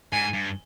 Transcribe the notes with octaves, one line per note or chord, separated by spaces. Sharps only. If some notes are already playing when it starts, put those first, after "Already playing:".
G#2 G#5
G2